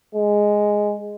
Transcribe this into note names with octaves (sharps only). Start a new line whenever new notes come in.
G#3